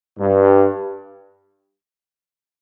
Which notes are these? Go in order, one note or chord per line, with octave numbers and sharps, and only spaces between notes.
G2